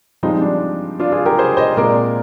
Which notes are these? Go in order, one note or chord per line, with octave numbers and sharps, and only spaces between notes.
G2 F3 G#3 C4 D#4
D4
D4 F4
F4 G#4
G4 A#4
G#4 C5
C5 D#5
A#2 G#3 C4 A#4 D5